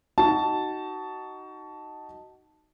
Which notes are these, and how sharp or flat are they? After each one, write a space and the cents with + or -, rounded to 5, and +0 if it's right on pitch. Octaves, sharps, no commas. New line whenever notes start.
D#4 +0 F#4 +20 A5 +0